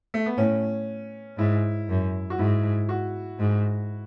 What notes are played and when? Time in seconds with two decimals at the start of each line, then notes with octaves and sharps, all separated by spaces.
0.14 A3
0.26 B3
0.37 A2 C#4
1.38 G#2 E4
1.88 F#2
2.30 F#4
2.38 G#2 E4
2.89 F#4
3.39 G#2